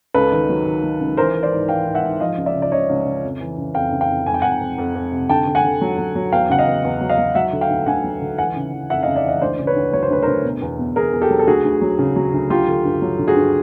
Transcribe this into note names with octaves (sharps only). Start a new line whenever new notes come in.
C#2 A4 B4
D#3
F#3
D#3
F#3
C#2
E3 A#4 C5
E3
C5 D5
G#2
E3 F5 G5
G#2
E5 F#5
G#2
F3 D#5 F5
C#2
D5 E5
C#3
D5
C#3 C#5 D#5
C#2
C#3
F2
E3
C#3
F2 F5 G5
C#3
F5 G5
F2
F2 G#5
G5
F2 F#5 G#5
F2
F2
F2
C3
D3 G5 A5
D3
F#5 G#5
D3
F#3
F#3
F#3
E2 F5 G5
C#3 F#5
D#5 F5
E2
E2
F#3
D#5 F5
F#3
F#3 E5 F#5
D3
F5 G5
D2
D2 F#5 G#5
F#3
D3
E3 F#5 G#5
C#3
E3
F2 E5 F#5
D#5 F5
C#3
D5 E5
E3 D#5 F5
D2 C5 D5
C#3
B4 C#5
D2
F#3 C#5
C5
D2 B4
D2 A#4 C5
B2
E2
B2
E2 G#4 A#4
E2
G4 A4
F#3
A4
D2 F#4 G#4
D2
F#3
C#3
F#3
D2
F#3 F4 G4
D3
G2
F#3
D3
F#4 G#4
G2